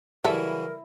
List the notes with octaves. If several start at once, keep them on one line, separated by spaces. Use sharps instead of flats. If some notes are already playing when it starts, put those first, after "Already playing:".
C#3 E3 F#3 G3 E4 A4 A#4